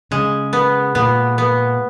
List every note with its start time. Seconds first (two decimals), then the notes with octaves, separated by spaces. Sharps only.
0.11 C#3 G#3
0.53 B3
0.95 A#2 B3
1.38 B3